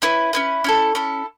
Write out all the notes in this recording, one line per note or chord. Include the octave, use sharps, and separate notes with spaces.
C#4 E4 B4
C#4 E4 B4
C#4 E4 A4
C#4 E4 A4